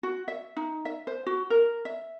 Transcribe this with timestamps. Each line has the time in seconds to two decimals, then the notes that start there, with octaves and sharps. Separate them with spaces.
0.03 F#4
0.28 E5
0.57 D#4
0.85 E5
1.07 C5
1.27 F#4
1.50 A#4
1.85 E5